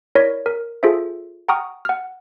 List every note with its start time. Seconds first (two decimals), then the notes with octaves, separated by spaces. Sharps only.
0.15 E4 A#4 C#5 D5 A#6 B6
0.46 A#4
0.83 F4 G#4 A4 C5 E5
1.48 F#5 G5 A#5 C#6 D#6 F6
1.85 F#5 F6